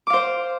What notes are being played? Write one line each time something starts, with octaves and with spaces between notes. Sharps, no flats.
C5 F5 D6